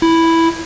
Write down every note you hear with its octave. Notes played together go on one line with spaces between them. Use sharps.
E4